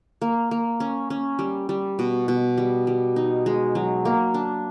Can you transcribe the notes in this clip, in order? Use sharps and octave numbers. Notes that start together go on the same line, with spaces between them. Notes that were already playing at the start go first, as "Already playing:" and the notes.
A#3
A#3
C#4
C#4
G3
G3
B2
B2
G3
G3
D#4
G#3
F#3
A#3
D4